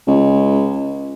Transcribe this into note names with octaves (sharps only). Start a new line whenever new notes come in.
C#2